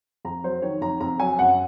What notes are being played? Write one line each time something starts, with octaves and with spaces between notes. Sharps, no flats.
F2 A#5
F#3 C5
D#3 C#5
F2 A#5
F2 A#5
F#3 G#5
F#2 F#5